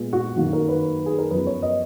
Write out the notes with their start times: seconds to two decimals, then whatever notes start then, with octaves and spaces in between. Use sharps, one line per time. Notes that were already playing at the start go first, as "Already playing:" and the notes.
Already playing: A#2 G#3 B3
0.13 F#4
0.36 F#2 D#3 A#3 F#4
0.53 A#4
0.69 B4
1.06 G#4
1.19 A#4
1.31 F#2 F3 B3 B4
1.47 C#5
1.62 D#5